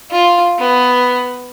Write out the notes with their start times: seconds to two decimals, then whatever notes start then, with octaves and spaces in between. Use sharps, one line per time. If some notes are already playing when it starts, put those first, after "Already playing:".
0.10 F4
0.59 B3